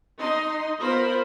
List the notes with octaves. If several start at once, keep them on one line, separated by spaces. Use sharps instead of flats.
D#4 D#5 C6
B3 F4 A#4 C5 B5